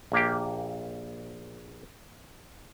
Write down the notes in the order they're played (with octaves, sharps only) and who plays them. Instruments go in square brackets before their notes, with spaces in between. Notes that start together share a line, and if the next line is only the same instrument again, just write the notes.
[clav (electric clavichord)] A#1 A#3 G4